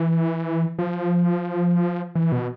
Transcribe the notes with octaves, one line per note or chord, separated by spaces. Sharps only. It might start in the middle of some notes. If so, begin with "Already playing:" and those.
Already playing: E3
F3
E3
B2